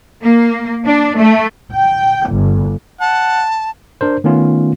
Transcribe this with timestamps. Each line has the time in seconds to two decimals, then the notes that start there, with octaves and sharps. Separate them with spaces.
0.23 A#3
0.85 D4
1.17 A3
1.73 G5
2.30 G1
3.00 F#5 A5
4.01 D4 A#4 C5
4.24 D#3 A3 B3 C#4 F4